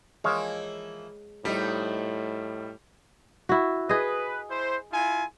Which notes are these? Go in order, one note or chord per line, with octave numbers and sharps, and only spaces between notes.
E3 F3 G#3 A#3 C#5 F5
A2 F3 G3 D#4 C5
E4 F#4
G#4 B4 D#5
E4 C5
E4 F4 G#5